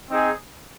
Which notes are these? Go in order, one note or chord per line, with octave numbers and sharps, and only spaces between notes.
C4 D#4 G#4